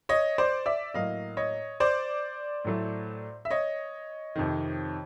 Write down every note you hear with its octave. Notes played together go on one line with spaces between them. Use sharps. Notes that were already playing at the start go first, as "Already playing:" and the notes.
C#5 D#5
C5 D5
D5 E5
A2 F#3 A#3 D#5 F5
C#5 D#5
C5 D5
A2 F#3 A3
E5
C#5 D#5
F2 C3 D#3